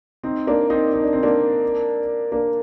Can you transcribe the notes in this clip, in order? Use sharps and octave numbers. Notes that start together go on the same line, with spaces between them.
C4 D#4
A#3 D4
C4 D#4
D#4
D4
C4
A#3 D4
A#3 D4